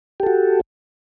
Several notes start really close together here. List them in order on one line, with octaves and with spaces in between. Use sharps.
G4 A4 F#4